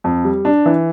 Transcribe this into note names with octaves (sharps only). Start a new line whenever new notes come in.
F2
G3
D4
E3